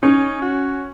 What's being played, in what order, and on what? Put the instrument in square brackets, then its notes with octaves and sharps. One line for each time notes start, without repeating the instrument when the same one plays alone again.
[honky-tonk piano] C#4 [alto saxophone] D#4
[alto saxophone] F#4